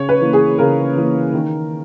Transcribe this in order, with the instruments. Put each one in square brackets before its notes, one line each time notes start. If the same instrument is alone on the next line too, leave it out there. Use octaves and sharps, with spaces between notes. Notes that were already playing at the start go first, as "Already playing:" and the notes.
Already playing: [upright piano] C#3 C#5
B4
E3 A#3
G#4
C#3 A#4
E3 A#3
D#3